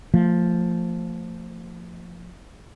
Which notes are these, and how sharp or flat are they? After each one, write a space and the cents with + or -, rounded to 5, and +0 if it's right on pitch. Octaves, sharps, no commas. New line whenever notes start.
F3 +0 A3 +40